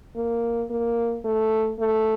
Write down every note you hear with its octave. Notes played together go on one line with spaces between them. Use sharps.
A#3
A#3
A3
A3